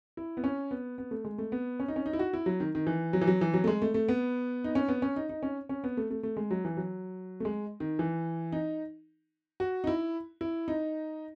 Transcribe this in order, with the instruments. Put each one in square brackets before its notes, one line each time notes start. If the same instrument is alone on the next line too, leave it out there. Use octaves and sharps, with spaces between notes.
[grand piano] E4
B3
C#4
B3
B3
A3
G#3
A3
B3
C#4
D#4
C#4
D#4
E4
F#4
E4
F#3
D#3
D#3
E3
F#3
E3
F#3
E3
F#3
A3
G#3
A3
A3
B3
D#4
C#4
B3
C#4
D#4
D#4
C#4
C#4
B3
A3
A3
A3
G#3
F#3
E3
F#3
A3
G#3
D#3
E3
D#4
F#4
D#4
E4
E4
D#4